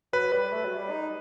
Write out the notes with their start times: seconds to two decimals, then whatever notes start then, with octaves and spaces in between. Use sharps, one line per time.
0.13 F#3 B4
0.32 G3 B4
0.52 A3
0.65 F#3
0.77 G3
0.90 D#4